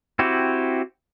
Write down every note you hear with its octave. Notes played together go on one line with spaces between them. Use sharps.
C4 E4 F#4 G4